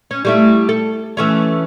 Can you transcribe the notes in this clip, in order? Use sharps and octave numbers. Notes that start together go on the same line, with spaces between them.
C#4
G3 A3 E4
A4
E3 A3 C#4